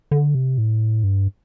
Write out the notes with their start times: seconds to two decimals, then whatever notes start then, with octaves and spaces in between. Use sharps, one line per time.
0.11 D3
0.35 C3
0.58 A2
1.04 G2